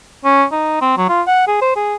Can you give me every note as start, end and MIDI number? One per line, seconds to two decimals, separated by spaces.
0.25 0.45 61
0.52 0.78 63
0.81 0.95 60
0.98 1.08 54
1.09 1.22 65
1.27 1.47 78
1.47 1.60 68
1.62 1.75 72
1.76 1.96 68